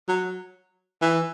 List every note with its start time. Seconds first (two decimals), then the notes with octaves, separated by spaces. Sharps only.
0.08 F#3
1.02 E3